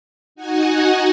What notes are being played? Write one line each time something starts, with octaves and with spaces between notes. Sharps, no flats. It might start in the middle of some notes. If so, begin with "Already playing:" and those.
D#4 F#4 F#5 G#5